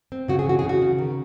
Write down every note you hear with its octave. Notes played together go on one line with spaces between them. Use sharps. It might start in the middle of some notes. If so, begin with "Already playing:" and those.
C4
C#3 F#4
G#4
E3 F#4
G#4
C#3 F#4
C#3
D#3